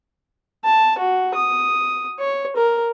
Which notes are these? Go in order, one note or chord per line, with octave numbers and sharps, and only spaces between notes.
A5
F#4
D#6
C#5
A#4